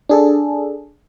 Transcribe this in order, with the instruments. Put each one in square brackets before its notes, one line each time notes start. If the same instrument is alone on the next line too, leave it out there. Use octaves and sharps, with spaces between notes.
[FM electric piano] D4 G#4 A4